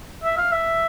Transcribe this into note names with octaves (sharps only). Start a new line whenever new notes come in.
E5
F5
E5